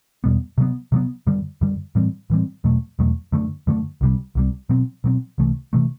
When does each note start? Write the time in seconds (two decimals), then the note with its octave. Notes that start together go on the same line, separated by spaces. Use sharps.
0.24 E2 B2 G3 B3
0.58 C3 F#3 B3
0.92 C3 F#3 B3
1.27 F#2 D3 G3
1.61 F#2 D3 G3
1.95 A2 E3 G3 C4
2.30 A2 E3 G3 C4
2.64 E2 B2 F#3 A3
2.99 E2 B2 F#3 A3
3.32 F#2 D3 A3
3.67 F#2 D3 A3
4.01 C2 C3 G3
4.35 C2 C3 G3
4.69 B2 F#3 C4
5.04 B2 F#3 C4
5.38 C2 C3 E3 A3
5.73 C3 E3 A3